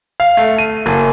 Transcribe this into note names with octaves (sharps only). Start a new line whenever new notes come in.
F5
A3
D#7
F#1